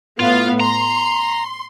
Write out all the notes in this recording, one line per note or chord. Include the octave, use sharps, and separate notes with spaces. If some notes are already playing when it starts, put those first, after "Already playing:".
A2 B3 F4 F5
A#5 C6